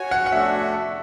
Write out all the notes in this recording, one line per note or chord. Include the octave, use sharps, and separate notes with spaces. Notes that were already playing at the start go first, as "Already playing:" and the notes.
Already playing: F#4 C#5 G#5
F#5
F#5
A3 D4 F#4 E5